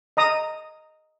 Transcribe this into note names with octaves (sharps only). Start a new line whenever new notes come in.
D#5 A#5 D#6